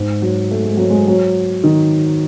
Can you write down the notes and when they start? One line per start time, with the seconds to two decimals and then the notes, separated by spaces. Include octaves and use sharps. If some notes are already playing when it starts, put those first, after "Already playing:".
Already playing: G#2
0.22 F#3
0.51 A3
0.64 G#3
0.77 F#3
0.90 G#3
1.08 F#3
1.64 D#3